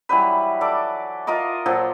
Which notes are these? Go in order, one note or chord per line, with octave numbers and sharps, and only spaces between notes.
E3 F#3 G3 B4
A4 D5 D6
F4 A#4 D#5 D6
A#2 F3 F#3 A4